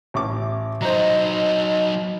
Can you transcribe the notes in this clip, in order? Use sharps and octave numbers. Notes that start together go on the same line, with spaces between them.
A1 C#6 D6
F#3 D#4 C5 D#5 A#5